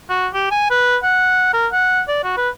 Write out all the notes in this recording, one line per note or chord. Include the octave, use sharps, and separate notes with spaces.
F#4
G4
G#5
B4
F#5
A#4
F#5
D5
F#4
B4